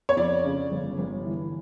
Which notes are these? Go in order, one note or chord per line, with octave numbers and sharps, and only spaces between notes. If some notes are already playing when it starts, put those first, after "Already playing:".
C#5
F2 D5
C#3
G1
G1
E3